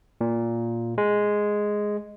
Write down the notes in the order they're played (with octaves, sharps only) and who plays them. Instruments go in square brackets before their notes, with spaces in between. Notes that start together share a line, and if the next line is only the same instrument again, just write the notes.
[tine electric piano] A#2
G#3